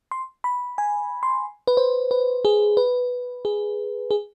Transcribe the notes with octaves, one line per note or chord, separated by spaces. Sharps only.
C6
B5
G#5
C6
B4
C5
B4
G#4
B4
G#4
G#4